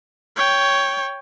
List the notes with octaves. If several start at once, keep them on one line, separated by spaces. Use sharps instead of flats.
C#5 G5